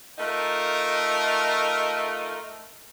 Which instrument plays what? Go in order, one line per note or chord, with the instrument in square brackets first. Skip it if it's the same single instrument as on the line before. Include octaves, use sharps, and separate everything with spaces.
[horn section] A3 D#4 F4 A#4